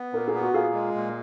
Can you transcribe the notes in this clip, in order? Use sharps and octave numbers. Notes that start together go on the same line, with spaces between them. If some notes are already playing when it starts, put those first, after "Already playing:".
Already playing: B3
A#2 A#4
G#4
B3
F#4
A#2 F4 G#4
G#3
A#2